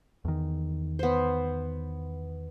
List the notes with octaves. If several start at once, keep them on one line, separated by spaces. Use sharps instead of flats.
E2 D#3
B3 C5